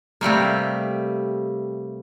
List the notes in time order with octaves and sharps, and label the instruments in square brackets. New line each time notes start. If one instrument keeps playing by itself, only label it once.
[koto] C3 G3 A3 A#3